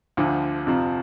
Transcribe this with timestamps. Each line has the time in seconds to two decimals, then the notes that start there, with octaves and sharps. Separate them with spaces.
0.17 D2 D3 F3
0.67 F2 C3 F3